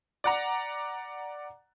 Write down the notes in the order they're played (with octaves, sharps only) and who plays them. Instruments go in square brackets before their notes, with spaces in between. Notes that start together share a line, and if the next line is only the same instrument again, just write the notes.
[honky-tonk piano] D5 F#5 A#5